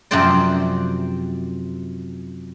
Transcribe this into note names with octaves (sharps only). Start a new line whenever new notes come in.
F#2 C3 F3 C4 C5 D5